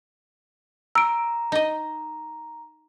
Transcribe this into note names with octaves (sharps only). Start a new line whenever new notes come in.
A#5 E6 D7
D#4 D#5